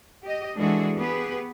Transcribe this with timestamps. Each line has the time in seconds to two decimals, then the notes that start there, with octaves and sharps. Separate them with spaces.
0.23 G4 D#5
0.57 E3 G#3 D4 F#4 G#4 A4
0.96 B3 G4 G#4 B4